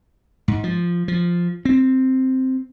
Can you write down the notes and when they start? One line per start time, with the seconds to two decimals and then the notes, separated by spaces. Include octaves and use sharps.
0.48 G#2
0.64 F3
1.08 F3
1.65 C4